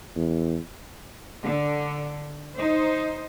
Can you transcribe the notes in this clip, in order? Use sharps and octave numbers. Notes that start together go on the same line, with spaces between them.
E2
D3
D#4 C5